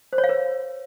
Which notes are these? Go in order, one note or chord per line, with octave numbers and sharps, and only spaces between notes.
C5
C#5
F5
B4